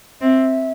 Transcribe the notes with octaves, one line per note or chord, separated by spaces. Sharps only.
C4 E5